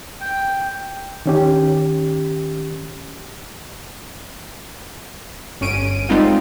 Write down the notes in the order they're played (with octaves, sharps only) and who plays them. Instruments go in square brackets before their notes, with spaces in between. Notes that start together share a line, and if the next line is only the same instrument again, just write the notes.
[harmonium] G5
[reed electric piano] D#3 C#4 G4
[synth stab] G1 C#4 D7 D#7
G3 G#3 B3 C4 D#4 F4